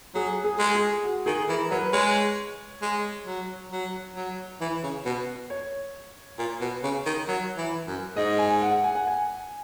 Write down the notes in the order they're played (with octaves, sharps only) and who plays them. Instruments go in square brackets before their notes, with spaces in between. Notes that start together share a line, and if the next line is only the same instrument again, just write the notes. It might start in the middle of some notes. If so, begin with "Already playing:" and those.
[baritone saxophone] F#3 [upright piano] G#4
[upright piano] G#4
[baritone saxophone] G#3
[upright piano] G#4
F#4
[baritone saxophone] D#3 [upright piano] G#4
[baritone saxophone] E3 [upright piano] A#4
[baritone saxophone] F#3 [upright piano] B4
[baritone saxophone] G#3 [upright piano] C#5
[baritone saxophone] G#3
F#3
F#3
F#3
E3
C#3
B2
[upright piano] C#5
[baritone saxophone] A#2
B2
C#3
D#3
F#3
E3
F#2
[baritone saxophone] G#2 [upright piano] D#5
[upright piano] G#5
F#5
G#5
F#5
G#5